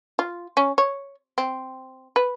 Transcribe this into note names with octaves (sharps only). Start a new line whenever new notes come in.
F4
C#4
C#5
C4
B4